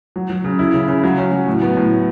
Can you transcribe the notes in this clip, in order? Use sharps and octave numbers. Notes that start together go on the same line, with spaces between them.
F#3
F#3
C#3
E4
C#3
C#3
F#3
C#4
F#3
A2
B3
A2